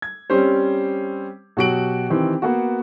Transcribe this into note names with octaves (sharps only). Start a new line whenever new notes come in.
G#6
G3 C4 C#4 G4 C5
B2 F#3 F#4 G4 D7 F#7
D#3 E3 C4 G4
A#3 B3 F#4